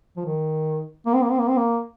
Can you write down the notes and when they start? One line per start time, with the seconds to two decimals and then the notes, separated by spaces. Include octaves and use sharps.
0.17 F3
0.25 D#3
1.06 A#3
1.14 C4
1.23 A#3
1.31 C4
1.40 A#3
1.48 C4
1.57 A#3